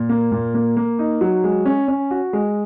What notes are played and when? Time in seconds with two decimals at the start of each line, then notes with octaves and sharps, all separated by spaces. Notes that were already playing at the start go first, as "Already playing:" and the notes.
Already playing: A#2
0.09 A#3
0.32 A#2
0.54 A#3
0.77 A#3
0.99 D#4
1.21 F#3
1.44 G#3
1.66 C#4
1.88 C#4
2.11 F#4
2.33 G#3